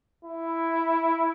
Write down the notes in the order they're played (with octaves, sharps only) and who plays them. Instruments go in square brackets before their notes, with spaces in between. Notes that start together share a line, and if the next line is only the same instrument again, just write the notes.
[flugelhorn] E4